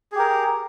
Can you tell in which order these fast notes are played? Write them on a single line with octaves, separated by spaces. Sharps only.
G#4 G4 A#4